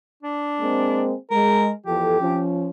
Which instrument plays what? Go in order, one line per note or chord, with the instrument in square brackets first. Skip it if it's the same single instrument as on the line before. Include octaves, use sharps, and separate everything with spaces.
[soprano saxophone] D4
[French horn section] G#3 A#3 C4
[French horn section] G#3 [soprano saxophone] A#4
[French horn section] E2 F3 A4 [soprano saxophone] G4
[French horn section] F3 C#4